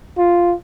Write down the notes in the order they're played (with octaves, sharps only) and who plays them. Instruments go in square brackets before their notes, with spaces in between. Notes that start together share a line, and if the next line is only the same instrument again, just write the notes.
[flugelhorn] F4